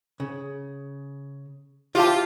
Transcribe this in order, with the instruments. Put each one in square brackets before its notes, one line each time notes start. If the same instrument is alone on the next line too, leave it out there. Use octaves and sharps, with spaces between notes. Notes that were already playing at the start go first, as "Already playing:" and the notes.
[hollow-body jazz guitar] C#3
[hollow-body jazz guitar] E4 F5 A5 [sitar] F4 [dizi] G4